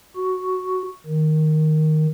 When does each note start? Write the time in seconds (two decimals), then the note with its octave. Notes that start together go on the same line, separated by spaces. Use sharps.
0.16 F#4
1.06 D#3